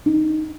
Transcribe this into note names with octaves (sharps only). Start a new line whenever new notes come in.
D#4